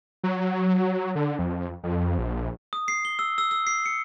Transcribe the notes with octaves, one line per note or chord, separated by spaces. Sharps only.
F#3
D3
F2
F2
A#1
D#6
C7
G7
E6
E6
E6
C7
C#7